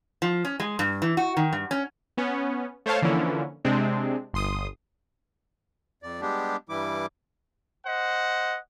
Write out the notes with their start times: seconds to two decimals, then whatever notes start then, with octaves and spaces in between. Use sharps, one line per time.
0.22 F3
0.45 C#4
0.60 G#3
0.79 G2
1.02 E3
1.17 F#4
1.37 D#3
1.53 G2
1.71 C#4
2.17 B3 C#4
2.86 A3 C5 C#5 F5 A5
3.02 D3 E3 F3 A#3 C#4 E4
3.65 C3 G#3 C4 D4
4.34 G1 C6 D#6
6.03 F2 D5
6.21 G3 G#3 B3 D4 G4
6.69 G2 E3 G3 E4 D6
7.86 C5 D#5 F#5